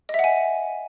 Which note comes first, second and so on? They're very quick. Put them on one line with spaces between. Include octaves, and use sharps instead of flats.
D#5 E5 F#5 G#5